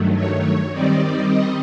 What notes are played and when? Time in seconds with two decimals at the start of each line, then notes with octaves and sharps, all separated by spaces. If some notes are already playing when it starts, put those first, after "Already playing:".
Already playing: G2 D#3 F#3 A3
0.14 C#5
0.71 D#3 G3 C4 D#4 D5
1.27 D#5